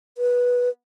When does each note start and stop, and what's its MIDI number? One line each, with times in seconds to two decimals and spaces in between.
0.18 0.69 71